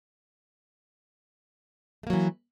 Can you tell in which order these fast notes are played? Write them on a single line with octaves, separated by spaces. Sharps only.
A3 A#3 F#3 E3